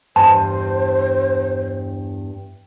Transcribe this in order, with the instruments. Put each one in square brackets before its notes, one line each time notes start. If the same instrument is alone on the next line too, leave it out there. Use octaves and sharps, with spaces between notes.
[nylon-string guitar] E2 G2 [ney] C5 [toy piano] A5